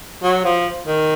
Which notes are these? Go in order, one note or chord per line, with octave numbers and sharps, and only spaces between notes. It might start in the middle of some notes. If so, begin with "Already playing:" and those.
F#3
F3
D#3